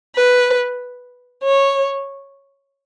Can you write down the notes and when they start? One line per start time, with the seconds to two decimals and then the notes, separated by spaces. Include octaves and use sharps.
0.15 B4
1.44 C#5